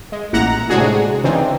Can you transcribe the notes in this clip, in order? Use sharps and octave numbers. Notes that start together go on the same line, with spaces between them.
G#3
A1 A#2 E4 F#5 A#5
A2 C3 G#3 D4 F#4 G#4
C#3 E3 C4 D4 D#4